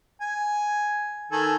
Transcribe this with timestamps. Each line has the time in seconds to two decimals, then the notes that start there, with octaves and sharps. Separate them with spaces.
0.21 G#5
1.32 D#3 A4 G#5